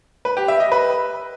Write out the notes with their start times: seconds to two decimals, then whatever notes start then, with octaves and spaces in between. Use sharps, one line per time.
0.25 B4
0.37 G4
0.48 E5
0.60 D#5
0.72 B4